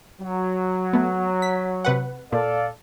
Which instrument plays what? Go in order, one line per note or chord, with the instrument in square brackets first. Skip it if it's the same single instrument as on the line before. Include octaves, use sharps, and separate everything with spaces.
[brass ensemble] F#3
[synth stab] A3 B3
B6
C3 B4 F#5
[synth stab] A#2 [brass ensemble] A4 D5 F5